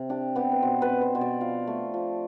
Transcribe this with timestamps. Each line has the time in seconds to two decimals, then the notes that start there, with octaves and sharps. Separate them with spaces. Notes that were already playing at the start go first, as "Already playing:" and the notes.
Already playing: C3
0.09 D4 G4
0.36 B3 G4
0.52 B4
0.62 B2 C5
0.82 B4
0.89 C4
1.02 C5
1.15 B2 C5
1.21 D5
1.41 F3 F5
1.67 A3
1.94 F3